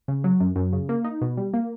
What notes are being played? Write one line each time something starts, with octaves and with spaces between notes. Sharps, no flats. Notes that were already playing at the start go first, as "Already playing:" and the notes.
C#3
F#3
F#2
F#2
C#3
A#3
D#4
B2
G3
A#3